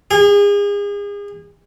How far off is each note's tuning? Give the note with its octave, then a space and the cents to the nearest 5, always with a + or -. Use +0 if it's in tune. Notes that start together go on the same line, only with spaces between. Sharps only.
G#4 -35